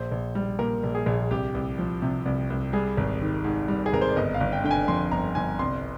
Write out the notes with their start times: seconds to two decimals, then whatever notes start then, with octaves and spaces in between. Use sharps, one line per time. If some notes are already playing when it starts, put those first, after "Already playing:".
Already playing: A#1 C5
0.12 A#1
0.35 G3
0.59 A#2 A#4
0.83 A#1
0.95 G#4
1.06 A#1
1.31 C2 G4
1.55 C2
1.79 F3
2.02 C3
2.26 C2
2.50 C2
2.73 G3 G#4
2.97 G#1
3.21 D#3
3.44 G#2
3.68 G3
3.86 G#4
3.93 G#1 A#4
4.01 C5
4.09 D5
4.16 G1 D#5
4.34 F5
4.40 G1
4.53 G5
4.64 D3 G5
4.71 G#5
4.88 F2 C6
5.11 G1 A#5
5.35 G1 G#5
5.59 C2 C6